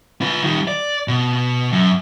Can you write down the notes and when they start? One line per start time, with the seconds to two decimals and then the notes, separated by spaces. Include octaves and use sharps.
0.21 F4 B4
0.43 D#3 G3
0.68 D5
1.08 B2
1.72 F#2